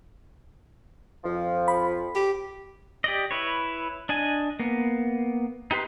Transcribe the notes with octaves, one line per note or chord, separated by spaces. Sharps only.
F2 F3
B5
G4
G4 D5 D#5
E4 B4 C#5
D4 D#5 G#5
A#3 B3
D#4 G4 B4 C6